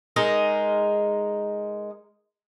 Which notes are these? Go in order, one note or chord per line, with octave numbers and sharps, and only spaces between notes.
G#3 D#4 A#4